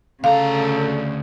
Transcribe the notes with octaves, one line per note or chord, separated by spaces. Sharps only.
D2 C#3 A4 F5 A#5